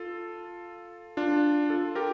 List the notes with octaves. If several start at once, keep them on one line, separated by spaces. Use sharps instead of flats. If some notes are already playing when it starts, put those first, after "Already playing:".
Already playing: F4 A4
D4 F4
F4 A4
G4 A#4